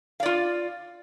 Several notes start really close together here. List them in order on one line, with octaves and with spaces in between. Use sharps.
F5 D5 F4